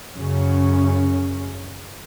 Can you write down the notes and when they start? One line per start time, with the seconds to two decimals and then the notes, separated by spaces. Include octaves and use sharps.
0.14 F#2 C#3 C#4